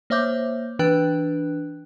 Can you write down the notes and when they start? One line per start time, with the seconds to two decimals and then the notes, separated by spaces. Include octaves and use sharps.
0.10 A#3 C5 C#5 E5 D6 G6
0.79 E3 D4 B4 G5 F#6